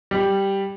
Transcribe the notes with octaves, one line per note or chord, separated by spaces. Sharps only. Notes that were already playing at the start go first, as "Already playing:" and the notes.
G3